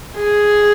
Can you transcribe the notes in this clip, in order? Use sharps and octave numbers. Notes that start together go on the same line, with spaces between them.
G#4